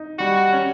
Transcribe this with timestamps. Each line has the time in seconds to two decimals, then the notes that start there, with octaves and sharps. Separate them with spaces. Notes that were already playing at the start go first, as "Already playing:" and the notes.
Already playing: D#4
0.19 G3 F#4
0.53 C#4